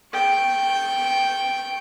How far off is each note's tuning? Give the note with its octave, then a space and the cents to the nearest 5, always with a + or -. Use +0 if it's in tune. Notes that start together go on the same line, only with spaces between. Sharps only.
G5 +0 C#6 -15